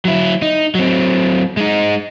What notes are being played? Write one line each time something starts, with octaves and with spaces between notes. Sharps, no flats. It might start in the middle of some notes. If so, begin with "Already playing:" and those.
F#3 E4
D#4
F#3 C4
G#3 D#4